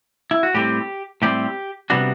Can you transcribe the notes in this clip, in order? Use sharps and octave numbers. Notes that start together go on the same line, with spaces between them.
E4
F#4
A2 G3 C4 G4
A2 G3 C4 G4
C3 G3 B3 D4 F#4